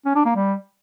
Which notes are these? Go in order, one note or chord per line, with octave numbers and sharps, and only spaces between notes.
C#4
D4
A#3
G3